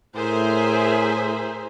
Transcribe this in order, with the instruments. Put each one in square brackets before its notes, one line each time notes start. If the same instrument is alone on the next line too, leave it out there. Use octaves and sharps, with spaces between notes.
[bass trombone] A2 [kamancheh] G#4 E5 [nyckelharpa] A#4 [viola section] C5